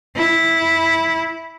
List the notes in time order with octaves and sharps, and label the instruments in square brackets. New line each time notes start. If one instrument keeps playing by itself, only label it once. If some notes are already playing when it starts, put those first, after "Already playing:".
[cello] E4